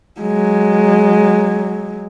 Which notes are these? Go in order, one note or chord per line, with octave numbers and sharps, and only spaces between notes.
F#3 G#3